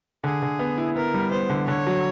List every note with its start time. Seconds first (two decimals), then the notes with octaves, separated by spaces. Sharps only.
0.24 D3 G#4
0.42 D3
0.59 B3
0.78 E4
0.96 B3 A#4
1.14 G3
1.31 B3 C5
1.50 D3
1.68 D3 C#5
1.87 F#3